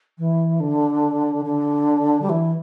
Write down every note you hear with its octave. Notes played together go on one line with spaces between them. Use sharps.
E3
D3
D3
G3
E3